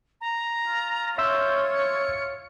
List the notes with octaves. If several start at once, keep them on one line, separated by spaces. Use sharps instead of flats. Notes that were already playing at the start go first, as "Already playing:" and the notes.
A#5
F4
C#5 E5 C6 E6 G6
C#7